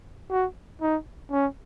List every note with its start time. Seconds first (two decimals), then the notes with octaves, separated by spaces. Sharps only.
0.31 F#4
0.81 D#4
1.31 C#4